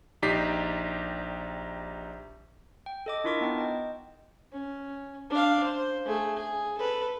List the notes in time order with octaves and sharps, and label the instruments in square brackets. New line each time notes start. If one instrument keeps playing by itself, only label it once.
[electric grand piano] A#1 D#4 G4 D5 B6 C7
[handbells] G5
A4 D#5 D6
D4 E4 F4 A#4 C#6 D6
B3 D#4 G5
D#5 G5
[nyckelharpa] C#4
D4 F5
C5
A3 G#4
G#4
A4 B4